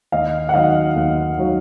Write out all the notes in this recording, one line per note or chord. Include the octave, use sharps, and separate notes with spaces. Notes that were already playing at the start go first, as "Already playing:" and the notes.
D#2 D#5 F5
F#5
D#3 F#3 D#5 F5
D#2
D#3 F#3